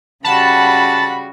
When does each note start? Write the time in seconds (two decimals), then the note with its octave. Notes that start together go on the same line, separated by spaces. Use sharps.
0.24 C#3 G3 F#4 F#5 A5 B5